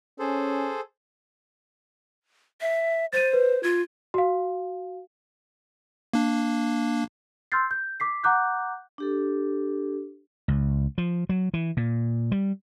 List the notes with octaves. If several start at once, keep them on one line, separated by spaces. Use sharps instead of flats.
C#4 G#4 A4 C5
E5
C5 A6 D#7
B4
F4 G#6
F#4 F5
A#3 D4
C6 E6 F6 G6 A6 C7
G6
D6 B6 C7
F#5 A#5 D6 F#6 G6
D4 G4 A4
C#2
F3
F#3
E3
A#2
G3